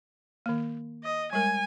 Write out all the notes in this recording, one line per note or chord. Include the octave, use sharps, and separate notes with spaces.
D#3 A#3
D#5
G3 G#3 A#4 G#5